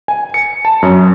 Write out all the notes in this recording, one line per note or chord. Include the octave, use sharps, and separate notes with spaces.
G#5
C#7
A5
F#2